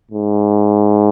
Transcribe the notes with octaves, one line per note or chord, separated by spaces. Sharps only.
G#2